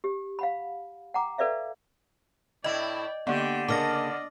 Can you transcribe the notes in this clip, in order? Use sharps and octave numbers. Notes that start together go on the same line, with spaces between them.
G4
F5 F#5 B5
F#5 G5 A#5 D6
A4 B4 D5 E5 F5
A2 E4 D5 D#5 G5
D3 A#3 B3 G4 G5
C#3 A#3 D4 D5 D#5 D6 F6 A#6